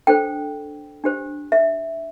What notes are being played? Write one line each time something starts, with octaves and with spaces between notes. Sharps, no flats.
D4 A4 C5 G5
D4 G4 C5
E5